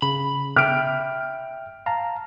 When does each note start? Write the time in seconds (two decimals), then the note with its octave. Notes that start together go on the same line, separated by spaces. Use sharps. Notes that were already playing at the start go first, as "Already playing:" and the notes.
0.02 C#3 B5
0.56 E5 G5 F6 D7
1.86 F5 A5 A#5